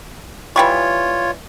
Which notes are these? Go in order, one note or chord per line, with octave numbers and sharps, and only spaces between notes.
E3 G3 F4 C#5 C#6